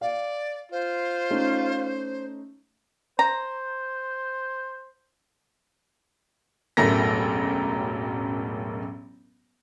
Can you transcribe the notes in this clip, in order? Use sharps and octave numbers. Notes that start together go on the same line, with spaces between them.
D5 F5
F4 C5
A3 C#4 D#4
C5 A#5
E1 A1 F#2 A3 A#4 A#6